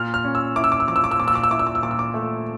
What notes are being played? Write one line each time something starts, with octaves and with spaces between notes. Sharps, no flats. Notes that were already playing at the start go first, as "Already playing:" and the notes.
Already playing: A#2 F6
F6
C#4
E6
E4 D6
E6
D6
E6
F3 D6
E6
D6
E6
A#2 D6
E6
D6
E6
E4 D6
E6
D6
E6
A#2 D6
E6
D6
A3